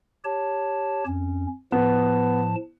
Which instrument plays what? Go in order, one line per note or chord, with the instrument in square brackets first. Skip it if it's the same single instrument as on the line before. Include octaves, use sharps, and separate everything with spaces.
[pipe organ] G4 C#5 A5
F2 C#4
[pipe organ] A2 F3 A5 [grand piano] B3